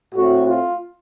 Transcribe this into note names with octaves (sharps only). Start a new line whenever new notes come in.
A2 A3 C4 F#4
F4